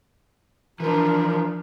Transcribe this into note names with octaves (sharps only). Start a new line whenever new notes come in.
E3 F3 D4 A#4